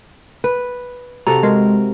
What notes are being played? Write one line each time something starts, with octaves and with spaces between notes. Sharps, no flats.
B4
C3 F#4 A4 A#5
G#3 A#4